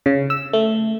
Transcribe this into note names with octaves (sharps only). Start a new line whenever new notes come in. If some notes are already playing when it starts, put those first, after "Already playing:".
C#3
E6
A3